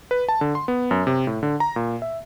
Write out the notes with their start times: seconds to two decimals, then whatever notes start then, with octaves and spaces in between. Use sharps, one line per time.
0.11 B4
0.29 A5
0.41 D3
0.55 C6
0.68 B3
0.91 F#2
1.07 C3
1.27 A2
1.43 D3
1.60 A#5
1.76 A#2
2.02 E5